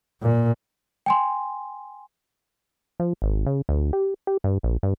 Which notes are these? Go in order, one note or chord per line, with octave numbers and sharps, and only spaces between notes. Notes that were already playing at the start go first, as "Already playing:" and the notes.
A#2
G5 G#5 C6
F3
G#1
C#3
D2
G4
G4
G2
A#1
G2